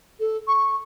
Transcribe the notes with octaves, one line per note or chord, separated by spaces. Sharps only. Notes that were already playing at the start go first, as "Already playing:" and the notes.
A4
C#6